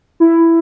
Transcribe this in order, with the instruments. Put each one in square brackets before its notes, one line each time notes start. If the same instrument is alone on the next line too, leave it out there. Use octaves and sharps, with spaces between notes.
[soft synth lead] E4